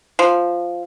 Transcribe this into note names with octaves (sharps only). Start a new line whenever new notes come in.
F3